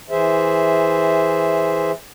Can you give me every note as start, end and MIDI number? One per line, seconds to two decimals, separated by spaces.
0.10 1.92 52
0.10 1.92 68
0.10 1.92 72
0.10 1.92 76